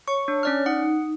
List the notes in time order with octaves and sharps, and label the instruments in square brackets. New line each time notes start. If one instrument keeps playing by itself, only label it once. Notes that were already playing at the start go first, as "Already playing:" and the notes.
[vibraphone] C#5 [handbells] C#6
[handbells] D4
C#4 D5 F6
[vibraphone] D#4 [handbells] F#5